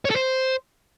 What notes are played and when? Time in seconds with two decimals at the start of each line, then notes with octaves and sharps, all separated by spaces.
0.05 C#5
0.10 A4
0.16 C5